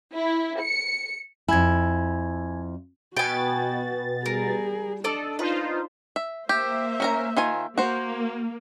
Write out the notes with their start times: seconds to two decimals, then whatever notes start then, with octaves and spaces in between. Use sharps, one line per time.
0.13 E4
0.62 C#7
1.48 F2 E4 G#5 G#6
3.17 B2 B3 F#4 G5 G#5 A6
4.26 G3 G#4 A#4
5.04 D4 A4 D5 D#5
5.39 D#4 F4 B4 C5
6.16 E5
6.49 A#3 G4 C5 E5
7.00 C#4 A#4 A#5
7.37 D#3 F4 G#5
7.78 A#3 F#4 C5